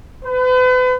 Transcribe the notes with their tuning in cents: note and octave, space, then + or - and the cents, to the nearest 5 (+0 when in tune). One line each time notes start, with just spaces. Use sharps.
B4 +40